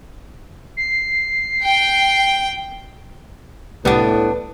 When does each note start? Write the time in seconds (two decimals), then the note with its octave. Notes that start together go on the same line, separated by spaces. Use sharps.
0.77 C7
1.63 G5
3.85 C2 A2 G3 B3 D4 B4